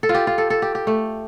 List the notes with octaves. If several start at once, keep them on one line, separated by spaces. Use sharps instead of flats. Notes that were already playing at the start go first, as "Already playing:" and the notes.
A4
F4
G4
F4
A4
A4
G4
G4
A3